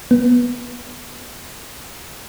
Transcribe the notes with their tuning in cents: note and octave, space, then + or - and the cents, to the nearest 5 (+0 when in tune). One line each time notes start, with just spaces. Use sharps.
B3 -15